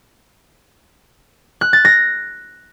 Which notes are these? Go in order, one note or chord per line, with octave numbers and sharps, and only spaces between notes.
F#6
A6
A#6